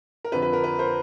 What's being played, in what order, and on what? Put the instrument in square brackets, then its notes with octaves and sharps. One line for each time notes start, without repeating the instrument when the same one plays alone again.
[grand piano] A#4
F2 D3 F3 B4
B4
A#4
B4
A#4 C5